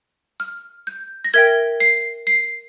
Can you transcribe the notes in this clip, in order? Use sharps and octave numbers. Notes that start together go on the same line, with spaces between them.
F6
G6
A#6
A#4 E5 G5 G#6
C7
C7